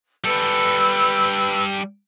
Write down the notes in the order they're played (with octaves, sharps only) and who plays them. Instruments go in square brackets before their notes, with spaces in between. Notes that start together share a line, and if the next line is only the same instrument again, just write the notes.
[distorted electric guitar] G3 A4 [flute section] B4 E6